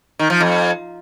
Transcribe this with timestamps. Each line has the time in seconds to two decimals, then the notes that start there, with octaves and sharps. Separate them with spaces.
0.19 D#3
0.30 F3
0.41 F2